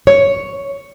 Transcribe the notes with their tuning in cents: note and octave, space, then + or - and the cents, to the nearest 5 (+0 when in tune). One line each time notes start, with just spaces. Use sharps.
C#5 +5